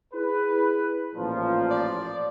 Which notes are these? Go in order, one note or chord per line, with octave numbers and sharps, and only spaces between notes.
E4 G#4 B4
A1 A#2 F3
D5